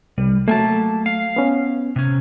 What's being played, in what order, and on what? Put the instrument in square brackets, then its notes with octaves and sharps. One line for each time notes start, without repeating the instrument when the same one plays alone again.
[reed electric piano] C2 [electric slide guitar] G3
[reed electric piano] F#3 A3 [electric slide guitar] A#3 G#5 A5
[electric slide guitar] F5
[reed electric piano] B3 C#4
[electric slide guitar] C3 C#4